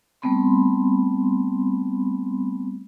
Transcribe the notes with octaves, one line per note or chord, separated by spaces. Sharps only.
G3 A3 B3 C4 B5 C6